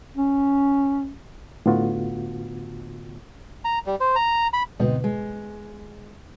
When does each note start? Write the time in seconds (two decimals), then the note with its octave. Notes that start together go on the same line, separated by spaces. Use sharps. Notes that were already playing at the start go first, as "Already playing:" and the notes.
0.17 C#4
1.66 A2 D3 B3 F4 F#4
3.65 A#5
3.86 G3
4.00 C5
4.16 A#5
4.53 B5
4.79 D2 G#2 B2 B3 C4 D#4
5.04 G#3